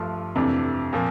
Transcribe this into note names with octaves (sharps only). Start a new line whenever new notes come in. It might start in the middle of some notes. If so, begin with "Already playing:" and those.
Already playing: G2 F3 A3 D4 F4
F2 C3 E3 A3 D4
A#2 F3 A#3